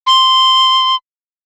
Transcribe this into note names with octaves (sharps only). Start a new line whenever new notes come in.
C6